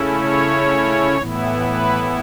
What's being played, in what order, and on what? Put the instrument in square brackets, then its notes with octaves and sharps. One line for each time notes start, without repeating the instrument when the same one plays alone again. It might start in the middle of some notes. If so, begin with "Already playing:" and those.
Already playing: [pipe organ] C#3 A3 C#4 E4
C#5
A2 E3 B3 E4
B4